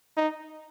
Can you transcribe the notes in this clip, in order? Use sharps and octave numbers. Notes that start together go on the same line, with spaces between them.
D#4